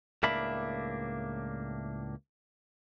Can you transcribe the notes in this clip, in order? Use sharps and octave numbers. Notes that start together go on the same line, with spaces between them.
C#2 A2 A#3 D4 E5 B5